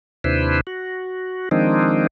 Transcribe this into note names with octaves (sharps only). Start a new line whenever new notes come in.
D#2 C3 D4 E4 B4 C5
F#4
D#3 F3 G#3 C4 D4 D#4